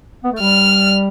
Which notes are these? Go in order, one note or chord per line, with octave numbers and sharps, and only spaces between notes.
B3
A3
G3 F6